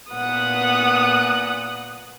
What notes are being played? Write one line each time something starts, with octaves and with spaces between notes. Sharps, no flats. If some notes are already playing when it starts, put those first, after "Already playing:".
A#2 B3 F#5 D#6 F#6